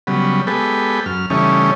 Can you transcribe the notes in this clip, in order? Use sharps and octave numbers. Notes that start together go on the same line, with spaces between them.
C#3 F#3 G3 B3
G#3 B3 G4 A4 B4
F#2 F6
C#3 E3 G3 A3 C#4 D#4